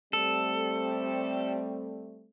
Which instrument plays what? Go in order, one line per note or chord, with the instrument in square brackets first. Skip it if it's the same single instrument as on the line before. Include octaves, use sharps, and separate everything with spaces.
[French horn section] G3 A3 C4 [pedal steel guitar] A4